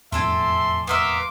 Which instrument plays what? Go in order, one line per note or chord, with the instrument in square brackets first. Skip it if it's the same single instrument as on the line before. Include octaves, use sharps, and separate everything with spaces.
[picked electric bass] E1 F2 A2 [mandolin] D4 A4 G#5 [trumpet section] E5 C6
[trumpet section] A#3 C6 D6 [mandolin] B3 A#4 E5